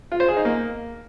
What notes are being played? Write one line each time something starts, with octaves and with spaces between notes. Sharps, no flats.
F4
C5
G#4
D#4
A#3